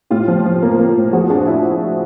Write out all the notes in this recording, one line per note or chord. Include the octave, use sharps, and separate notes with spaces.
A2 F4 G4
F3
F3
A#3
A#3
A2
F3 F#4 G#4
D4 F#4 G#4
D4 E4 F#4